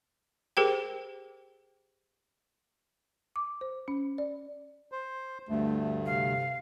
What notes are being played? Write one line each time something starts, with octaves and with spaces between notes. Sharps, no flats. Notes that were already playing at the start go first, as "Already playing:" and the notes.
G4 G#4 A#4 C5 G5
D6
C5
C#4
D5
C5
D2 G2 A3
C3 F5